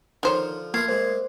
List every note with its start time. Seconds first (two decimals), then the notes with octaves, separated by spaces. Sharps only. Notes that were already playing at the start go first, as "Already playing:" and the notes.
0.23 D3 D#3 F3 C5 C#5
0.74 A3 A#3 F4 A#4 B4 G#6 C7
0.88 A#2 G#3 C5